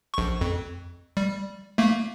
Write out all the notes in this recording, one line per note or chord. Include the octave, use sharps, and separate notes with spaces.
A#1 C#6
F2
G3
A3 A#3